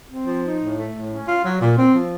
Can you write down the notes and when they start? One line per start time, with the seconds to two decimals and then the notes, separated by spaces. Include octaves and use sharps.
0.09 C4
0.26 F3
0.43 D#4
0.60 A2
0.76 A3
0.93 A2
1.10 C#4
1.26 F4
1.43 F#3
1.60 A#2
1.77 C4
1.93 F3